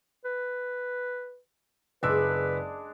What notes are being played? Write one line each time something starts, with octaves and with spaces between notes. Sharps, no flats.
B4
F#1 G#3 D4 B4 E6